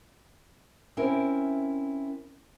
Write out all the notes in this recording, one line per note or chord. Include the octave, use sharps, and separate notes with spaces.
C4 C#4 E4 A#4